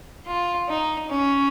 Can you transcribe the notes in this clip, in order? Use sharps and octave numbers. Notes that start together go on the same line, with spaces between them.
F4
D#4
C#4